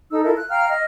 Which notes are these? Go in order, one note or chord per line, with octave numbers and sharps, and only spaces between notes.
D#4 A4 E6
E4 F4 A4 A#4
F#6
F5 G5 A#5 F6
D#5 F6